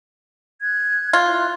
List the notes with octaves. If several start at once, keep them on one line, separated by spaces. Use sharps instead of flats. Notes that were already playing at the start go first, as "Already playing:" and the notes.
F#6 G#6
F4
E4 F6 F#6